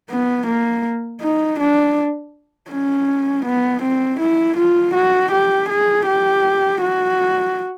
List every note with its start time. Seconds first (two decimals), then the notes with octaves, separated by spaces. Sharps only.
0.10 B3
0.47 A#3
1.21 D#4
1.59 D4
2.71 C#4
3.46 B3
3.82 C4
4.20 E4
4.57 F4
4.94 F#4
5.32 G4
5.69 G#4
6.07 G4
6.81 F#4